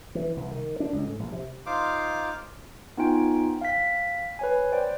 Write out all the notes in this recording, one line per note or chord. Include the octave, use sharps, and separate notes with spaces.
E3
C2
D#3
D4
C#2
A2
A#1
C3
D#4 F4 C5 F5 D6
B3 D#4 F4 G5 G#5
F5 G5 B6
B4 C#5 G#5
C5 D5 G5